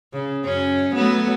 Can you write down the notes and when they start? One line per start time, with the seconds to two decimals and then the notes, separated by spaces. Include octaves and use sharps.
0.13 C#3
0.45 F#2 C#4
0.95 F#3 A3 B3